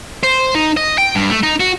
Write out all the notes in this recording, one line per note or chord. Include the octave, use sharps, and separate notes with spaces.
C5
D#4
D#5
G5
G2
A3
D#4
F#4